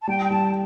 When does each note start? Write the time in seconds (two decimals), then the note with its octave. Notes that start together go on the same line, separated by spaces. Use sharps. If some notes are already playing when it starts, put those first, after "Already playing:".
0.02 A5
0.07 G3 G5
0.24 G5
0.30 G3 A5